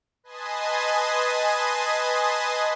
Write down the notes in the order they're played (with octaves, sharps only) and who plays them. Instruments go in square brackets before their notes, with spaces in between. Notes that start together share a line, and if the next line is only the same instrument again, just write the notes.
[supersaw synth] B4 D#5 G#5 A5 C6 D#6